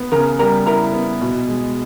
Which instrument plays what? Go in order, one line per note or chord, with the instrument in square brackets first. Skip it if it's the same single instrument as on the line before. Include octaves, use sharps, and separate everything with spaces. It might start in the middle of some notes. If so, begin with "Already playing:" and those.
Already playing: [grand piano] B3
[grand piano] C#3 [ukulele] A#4 A#5
[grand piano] G3 [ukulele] A#4 A#5
[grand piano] E4 [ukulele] A#4 A#5
[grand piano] B3
B2
G#3